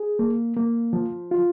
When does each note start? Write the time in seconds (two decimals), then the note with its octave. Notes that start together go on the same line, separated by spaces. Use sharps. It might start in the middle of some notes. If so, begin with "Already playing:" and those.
Already playing: G#4
0.19 A#3
0.57 A#3
0.93 F3
1.31 F4